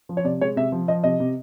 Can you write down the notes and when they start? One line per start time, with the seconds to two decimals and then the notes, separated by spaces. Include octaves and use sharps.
0.09 F3
0.17 C#5
0.24 C3 D5
0.41 G#3 C#5
0.56 C3 E5
0.72 F3
0.88 F3 D#5
1.04 C3 D#5
1.20 C3